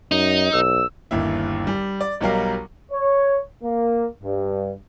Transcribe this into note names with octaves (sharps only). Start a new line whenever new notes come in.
F#2 D#4
B1 E6
G1 D#2 E4
G3
D5
B1 F#3 G3 A#4 F5
C#5
A#3
G2